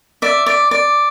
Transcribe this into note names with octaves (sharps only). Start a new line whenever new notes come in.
D5 E5
D5
D5